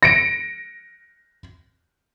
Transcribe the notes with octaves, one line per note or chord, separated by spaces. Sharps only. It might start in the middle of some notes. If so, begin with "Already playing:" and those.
A#6 C#7 D7